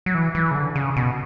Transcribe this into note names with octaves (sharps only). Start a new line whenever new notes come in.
F#3
E3
E3
C#3
D3
C#3
B2